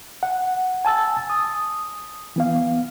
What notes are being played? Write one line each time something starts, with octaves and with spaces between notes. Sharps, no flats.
F#5
G#5 A5 E6 A6
D#6
E3 B3 F5